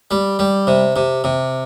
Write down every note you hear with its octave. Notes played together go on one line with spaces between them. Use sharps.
G3
G3
C3
C3
C3